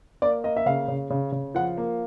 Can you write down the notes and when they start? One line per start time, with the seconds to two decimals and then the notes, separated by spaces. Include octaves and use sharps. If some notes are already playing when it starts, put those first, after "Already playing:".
0.22 A#3 D5
0.44 A#3 D#5
0.57 E5
0.66 C#3 F5
0.88 C#3
1.10 C#3
1.32 C#3
1.55 F3 F#5
1.77 A#3